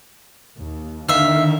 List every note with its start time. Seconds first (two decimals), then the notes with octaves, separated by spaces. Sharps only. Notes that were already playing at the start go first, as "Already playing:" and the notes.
0.58 D#2
1.09 D3 D#3 E5 F5